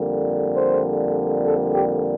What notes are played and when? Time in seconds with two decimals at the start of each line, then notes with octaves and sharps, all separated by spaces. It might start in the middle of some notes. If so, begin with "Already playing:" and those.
Already playing: F2 D3 G3 A#3
0.56 C5
1.45 A4
1.74 G4